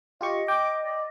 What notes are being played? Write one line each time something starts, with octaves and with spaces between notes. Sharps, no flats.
F4 G4 D#5 C#6
G5 D6
D5